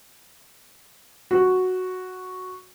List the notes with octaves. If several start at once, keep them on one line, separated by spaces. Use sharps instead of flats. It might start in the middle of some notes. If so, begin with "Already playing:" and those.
F#4